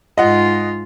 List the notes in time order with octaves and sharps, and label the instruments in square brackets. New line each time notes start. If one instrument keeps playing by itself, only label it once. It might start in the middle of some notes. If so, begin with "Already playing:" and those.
[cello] G#2 F4 [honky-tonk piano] D#5 F#5